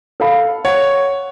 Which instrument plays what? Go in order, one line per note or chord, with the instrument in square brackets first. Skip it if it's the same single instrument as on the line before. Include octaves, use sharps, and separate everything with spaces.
[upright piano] A4 F5 B5
[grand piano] C#5 [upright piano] F#5